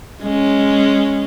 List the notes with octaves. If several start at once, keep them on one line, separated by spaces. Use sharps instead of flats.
G#3 C#4